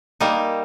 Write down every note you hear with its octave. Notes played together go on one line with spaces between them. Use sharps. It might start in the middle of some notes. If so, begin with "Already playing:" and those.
G3 A#3 D#4